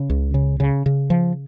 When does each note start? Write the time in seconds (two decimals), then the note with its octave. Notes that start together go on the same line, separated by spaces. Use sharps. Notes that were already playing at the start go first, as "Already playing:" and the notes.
Already playing: C#3
0.10 C#2
0.34 C#3
0.60 C#3
0.86 C#3
1.10 F3